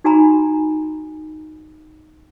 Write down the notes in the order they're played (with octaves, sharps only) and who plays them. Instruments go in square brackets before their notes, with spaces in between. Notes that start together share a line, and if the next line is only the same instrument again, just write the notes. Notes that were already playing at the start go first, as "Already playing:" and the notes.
[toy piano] D#4 F#4 G#5 A#5 B5